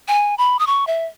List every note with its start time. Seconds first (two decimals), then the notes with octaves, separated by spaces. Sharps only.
0.08 G#5
0.38 B5
0.59 D#6
0.67 C#6
0.87 E5